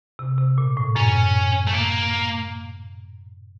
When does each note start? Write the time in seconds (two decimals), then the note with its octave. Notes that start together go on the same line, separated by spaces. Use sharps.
0.19 C3
0.38 C3
0.58 A#2
0.77 A2
0.95 F#2 C#4
1.67 A3
1.73 A#3